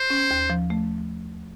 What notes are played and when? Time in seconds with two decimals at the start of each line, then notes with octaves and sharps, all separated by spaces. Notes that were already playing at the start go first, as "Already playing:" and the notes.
Already playing: C5
0.10 C#4
0.31 D#2
0.50 F3
0.70 A3